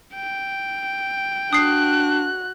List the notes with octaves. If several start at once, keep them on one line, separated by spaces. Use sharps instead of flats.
G5
D4 F#4 D#6 F#6 C7